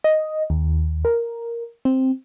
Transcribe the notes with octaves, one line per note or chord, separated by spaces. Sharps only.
D#5
D#2
A#4
C4